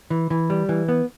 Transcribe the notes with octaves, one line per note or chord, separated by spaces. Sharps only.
E3
E3
G3
E3
B3